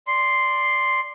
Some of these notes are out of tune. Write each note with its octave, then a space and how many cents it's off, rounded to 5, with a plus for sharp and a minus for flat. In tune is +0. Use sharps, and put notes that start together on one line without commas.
D5 +0 C6 +0